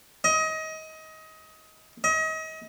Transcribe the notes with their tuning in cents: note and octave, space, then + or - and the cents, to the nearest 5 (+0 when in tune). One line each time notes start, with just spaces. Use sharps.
D#5 +25
D#5 +35